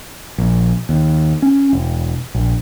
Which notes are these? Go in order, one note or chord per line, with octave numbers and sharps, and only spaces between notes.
A#1
D#2
C#4
E1
A#1